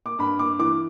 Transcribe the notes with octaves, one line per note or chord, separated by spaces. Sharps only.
D6
G2 B5
D6
E3 D6